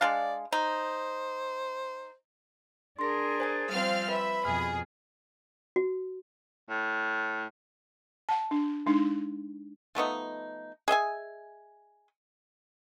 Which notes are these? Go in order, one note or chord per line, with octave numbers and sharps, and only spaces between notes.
G#3 D4 D5 F5
D#4 C5
D4 G#4 A#4 C6 A#6
C5 G#5 A6
F3 G3 C4 F5 F6
B4 E5 B5
F2 B2 G#4 F6
F#4
A2
F#5 A5
D4
G#3 D4 D#4
F3 A3 B3 D#4
G#4 D#5 E5 G#5